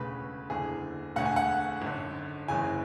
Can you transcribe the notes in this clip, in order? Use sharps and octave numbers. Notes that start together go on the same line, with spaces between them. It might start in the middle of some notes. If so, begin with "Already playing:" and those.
Already playing: E1 D2 C#3 B4
F#1 E2 D3 G#4
E1 D2 D3 F#5
G#5
F#5
G#1 F#2 D3
F#1 F#2 C#3 E3 G#5